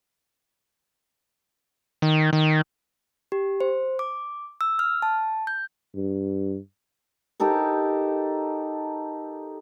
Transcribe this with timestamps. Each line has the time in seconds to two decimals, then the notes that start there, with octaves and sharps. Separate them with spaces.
2.02 D#3
2.33 D#3
3.32 G4
3.60 C5
3.99 D6
4.61 E6
4.79 F6
5.02 A5
5.47 G6
5.95 G2
7.40 D#4 G4 A4 A#4